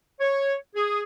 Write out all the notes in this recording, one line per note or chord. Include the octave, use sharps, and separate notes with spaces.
C#5
G#4